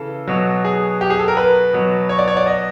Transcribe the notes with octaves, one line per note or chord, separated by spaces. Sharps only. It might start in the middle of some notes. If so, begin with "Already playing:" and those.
Already playing: C#3 E3 A4
B2 F#3
G#4
G4
G#4
A4
A#4
B4
B2 F#3
C#5
D5
C#5
D5
D#5